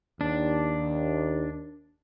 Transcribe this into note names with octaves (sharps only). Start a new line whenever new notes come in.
D#2 D4